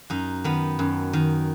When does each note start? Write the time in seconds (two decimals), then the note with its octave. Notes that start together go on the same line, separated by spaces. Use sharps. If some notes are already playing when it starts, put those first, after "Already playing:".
0.10 F#2 D#4
0.44 D#3 B3
0.79 F#2
1.13 D#3